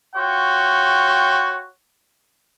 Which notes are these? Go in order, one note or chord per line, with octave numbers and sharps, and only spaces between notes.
F4 F#4 C#5 G5